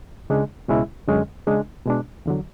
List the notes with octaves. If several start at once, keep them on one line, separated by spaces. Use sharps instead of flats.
C#2 C#3 G#3 D4
C#2 B2 G#3 C#4 E4
F#2 D3 G#3 C#4
C#3 G#3 D4
B2 G#3 D4
E2 D3 F#3